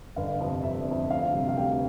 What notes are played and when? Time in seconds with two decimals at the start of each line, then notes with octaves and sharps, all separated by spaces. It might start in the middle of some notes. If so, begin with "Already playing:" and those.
0.16 G1 F5
0.40 F2 C3
0.63 G1 E5
0.87 F2 C3
1.10 D2 F5
1.34 C3 G3
1.49 F5
1.57 D2 G5